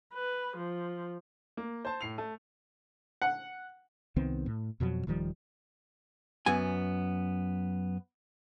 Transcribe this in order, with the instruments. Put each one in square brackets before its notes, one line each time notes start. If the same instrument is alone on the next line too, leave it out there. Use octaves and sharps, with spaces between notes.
[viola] B4
F3
[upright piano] A#3
C5 A5
A2 C7 F7
A3
[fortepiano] F#5
[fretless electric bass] C2 D#3 B3 C4
A2
F2 B2 F3 F#3
D#1 D#3 F3 G3
[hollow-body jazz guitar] F#2 B3 G#5